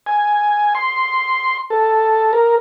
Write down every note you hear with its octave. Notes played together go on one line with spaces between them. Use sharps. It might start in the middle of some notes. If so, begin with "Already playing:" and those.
G#5
C6
A4
A#4